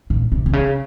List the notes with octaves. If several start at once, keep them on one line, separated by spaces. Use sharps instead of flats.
A#2
C3
C3
C#3